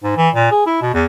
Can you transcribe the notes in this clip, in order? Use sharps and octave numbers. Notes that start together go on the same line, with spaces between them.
G#2
E3
A#2
G#4
E4
B2
E2